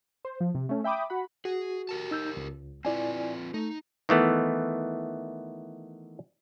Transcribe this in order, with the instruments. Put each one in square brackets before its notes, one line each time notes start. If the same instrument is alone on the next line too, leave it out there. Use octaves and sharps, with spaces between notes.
[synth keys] C5
F3
C3
A3 C#4
E5 G5 B5 D6 D#6
F#4 F#5 B5
[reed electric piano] F#4 [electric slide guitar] G#4
[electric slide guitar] G4 A#4 A5
[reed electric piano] D#4 E6 G6
C#2
[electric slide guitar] C4 F4 B4 [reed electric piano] E4 D5 G#5
[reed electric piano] A3 [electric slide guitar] D#4
[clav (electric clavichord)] D#3 E3 A3 B3